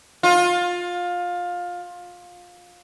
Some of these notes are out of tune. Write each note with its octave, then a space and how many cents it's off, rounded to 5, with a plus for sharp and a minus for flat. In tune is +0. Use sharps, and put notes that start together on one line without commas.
F4 +20